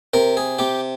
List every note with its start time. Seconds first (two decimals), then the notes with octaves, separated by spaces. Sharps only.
0.13 C3 A#4
0.37 G#4
0.59 C3 G4